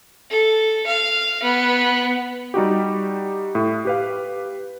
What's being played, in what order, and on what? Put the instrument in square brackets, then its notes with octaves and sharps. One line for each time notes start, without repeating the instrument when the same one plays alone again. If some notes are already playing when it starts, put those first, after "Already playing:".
[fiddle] A4
F5
B3
[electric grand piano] G3 D#4 F#4 G4
A2
G4 B4 F5